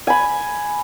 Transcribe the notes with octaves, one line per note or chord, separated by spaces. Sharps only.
G#5 B5